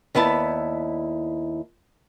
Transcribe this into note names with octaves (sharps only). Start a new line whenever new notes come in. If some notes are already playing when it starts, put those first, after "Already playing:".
D#2 B3 E4 D5 A5